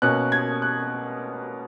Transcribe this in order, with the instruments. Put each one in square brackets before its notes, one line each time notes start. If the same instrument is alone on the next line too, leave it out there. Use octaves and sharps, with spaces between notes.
[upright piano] B2 A#3 C#4 F#6
G#6
F#6